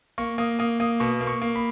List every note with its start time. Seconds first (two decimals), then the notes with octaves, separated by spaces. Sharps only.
0.18 A#3 C#6
0.38 A#3 D#6
0.59 A#3 D#6
0.80 A#3 D#6
1.00 B2 C#6
1.21 A#3
1.27 C#6
1.42 A#3
1.56 B5